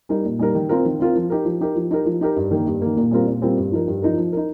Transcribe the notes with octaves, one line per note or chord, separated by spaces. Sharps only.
G3 D#4 A#4
A#2
G3 D#4 A#4
D#3
C4 F4 A#4
D#3
C4 F4 A#4
F3
D#4 G4 A#4
F3
D#4 G4 A#4
F3
D#4 G4 A#4
F3
D#4 G4 A#4
G2
D#3 A#3
G2
D#3 A#3
A#2
G3 C4 F4 A#4
A#2
G3 C4 F4 A#4
G2
F3 D#4 A#4
G2
F3 D#4 A#4
F3
D#4 A#4